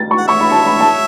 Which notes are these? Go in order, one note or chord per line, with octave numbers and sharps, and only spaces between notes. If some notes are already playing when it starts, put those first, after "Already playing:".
Already playing: A6
C#6
F#5
C#5 E5 C#6
B5
A5
B5
A5